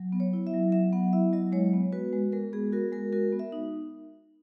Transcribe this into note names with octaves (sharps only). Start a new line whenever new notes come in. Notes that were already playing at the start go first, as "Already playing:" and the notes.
Already playing: F#3
B3
C#5
E4
E5
F#3
F#3 E5
B3 F#5
E4 E5
F#3 D#5
G#3 C#5
B3
F#4 B4
G#3
G#3 A#4
B3 G#4
F#4 A#4
G#3 A#4
F#4 A#4
B3
E5
D#4